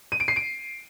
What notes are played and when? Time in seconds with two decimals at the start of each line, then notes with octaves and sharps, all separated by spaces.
0.12 D#7
0.20 D7
0.28 C7
0.36 D7